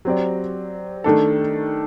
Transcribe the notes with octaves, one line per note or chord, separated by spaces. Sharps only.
F#3 C4 G4 D5
D#3 A3 D4 A4